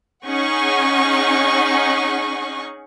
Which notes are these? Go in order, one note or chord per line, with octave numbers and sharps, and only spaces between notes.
C#4 D#4 G#4 F#5 C#6